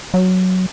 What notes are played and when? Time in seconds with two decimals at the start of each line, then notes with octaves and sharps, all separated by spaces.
0.14 F#3